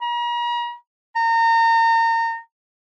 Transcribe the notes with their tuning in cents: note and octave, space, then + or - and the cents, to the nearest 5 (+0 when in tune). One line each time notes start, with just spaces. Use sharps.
A#5 +40
A#5 -30